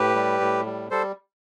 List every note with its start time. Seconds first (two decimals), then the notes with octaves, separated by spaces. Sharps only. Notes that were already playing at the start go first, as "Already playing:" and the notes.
Already playing: A2 G4 B4
0.15 G3
0.41 A2
0.66 G3
0.91 G3 A4 C5